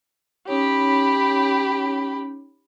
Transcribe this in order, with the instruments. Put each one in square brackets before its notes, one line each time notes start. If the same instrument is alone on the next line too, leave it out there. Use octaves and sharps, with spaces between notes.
[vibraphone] C#4 D#4 C#5 [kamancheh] G4 B5